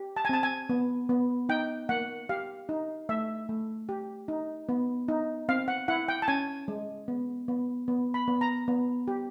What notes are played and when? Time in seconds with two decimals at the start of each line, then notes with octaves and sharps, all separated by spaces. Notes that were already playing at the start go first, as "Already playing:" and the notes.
Already playing: G4
0.16 A5
0.25 G#5
0.29 C4 A5
0.43 G#5
0.69 B3
1.09 B3
1.49 D#4 G5
1.89 A#3 F#5
2.29 G4 F5
2.69 D#4
3.09 A3 E5
3.49 A3
3.89 G4
4.28 D#4
4.69 B3
5.08 D#4
5.49 C4 F5
5.68 F#5
5.88 E4 F#5
6.08 G5
6.22 A5
6.28 C#4 G#5
6.68 G#3
7.08 B3
7.48 B3
7.88 B3
8.14 B5
8.28 B3
8.41 A#5
8.68 B3
9.08 G4